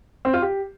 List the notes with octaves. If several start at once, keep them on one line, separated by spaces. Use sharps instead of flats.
C4
F4
G4